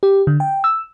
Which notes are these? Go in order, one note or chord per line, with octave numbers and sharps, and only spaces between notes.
G4
D3
G5
E6